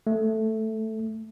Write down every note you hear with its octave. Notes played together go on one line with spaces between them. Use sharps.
A3